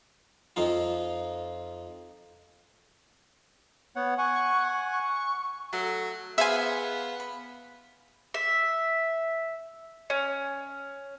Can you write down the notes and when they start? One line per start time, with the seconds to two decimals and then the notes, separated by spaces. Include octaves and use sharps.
0.56 F2 F3 D#4 F4
3.96 B3 C#5 F#5
4.18 F#5 G#5 C#6
4.92 C#6
5.73 F#3 A3
6.38 B3 G#4 C5 E5 F5 G#5
7.20 B5
8.34 E5
10.10 C#4